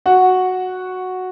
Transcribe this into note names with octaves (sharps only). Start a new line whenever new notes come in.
F#4 F#5